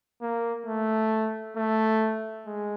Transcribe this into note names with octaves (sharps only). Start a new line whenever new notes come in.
A#3
A3
A3
G#3